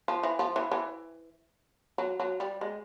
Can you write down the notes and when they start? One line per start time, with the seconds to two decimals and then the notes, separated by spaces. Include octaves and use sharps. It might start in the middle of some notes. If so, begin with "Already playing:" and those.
0.08 F3
0.23 E3
0.39 F3
0.56 E3
0.72 E3
1.98 F#3
2.20 F#3
2.40 G3
2.61 G#3